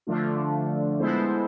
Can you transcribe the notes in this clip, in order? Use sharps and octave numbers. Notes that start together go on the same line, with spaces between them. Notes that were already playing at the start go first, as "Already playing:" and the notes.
D3 F3 A3 D4 F4
G#3 B3 E4 A4 C5